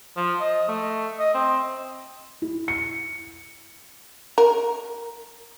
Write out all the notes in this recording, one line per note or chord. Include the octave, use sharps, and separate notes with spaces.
F3
D#5
A3
D#5
C4
E4
C#7
A#4